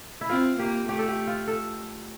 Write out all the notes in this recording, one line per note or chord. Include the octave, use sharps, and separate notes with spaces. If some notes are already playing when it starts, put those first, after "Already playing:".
E4
C4 F4
A#3 G4
A3 G4
A4
G4
F4
A4